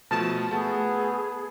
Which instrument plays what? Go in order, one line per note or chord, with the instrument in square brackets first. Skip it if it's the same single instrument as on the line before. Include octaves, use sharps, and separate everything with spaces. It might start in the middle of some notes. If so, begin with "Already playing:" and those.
[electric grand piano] B2 F3 A3 [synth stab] A5
[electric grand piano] A3 [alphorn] B3 [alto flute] G#4